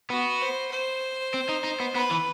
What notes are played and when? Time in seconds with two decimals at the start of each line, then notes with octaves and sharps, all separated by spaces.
0.10 B3 F#4
0.42 C5
0.71 C5
1.34 C4
1.49 D#4
1.64 D#4
1.80 B3
1.95 B3 B4
2.11 E3